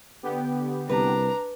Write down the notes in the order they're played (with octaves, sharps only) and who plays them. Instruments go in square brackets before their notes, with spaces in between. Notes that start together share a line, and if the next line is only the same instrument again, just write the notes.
[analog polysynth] D3 B3 G4
[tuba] C2 [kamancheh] D4 A#5 [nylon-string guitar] B4